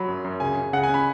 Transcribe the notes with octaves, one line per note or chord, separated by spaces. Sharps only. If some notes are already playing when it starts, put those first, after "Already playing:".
Already playing: F#3 B5
F#2
F#2
C#3 G#5
C#3
C#3 F#5
G#5
C#4 B5